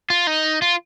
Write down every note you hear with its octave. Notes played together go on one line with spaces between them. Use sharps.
F4
D#4
F4